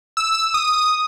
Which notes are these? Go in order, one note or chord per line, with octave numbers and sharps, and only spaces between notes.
E6
D#6